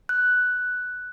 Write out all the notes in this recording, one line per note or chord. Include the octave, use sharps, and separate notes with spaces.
F#6